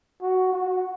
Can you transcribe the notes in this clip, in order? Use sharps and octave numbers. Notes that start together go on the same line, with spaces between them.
F#4
F#4